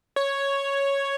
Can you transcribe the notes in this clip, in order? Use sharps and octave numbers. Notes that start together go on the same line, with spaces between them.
C#5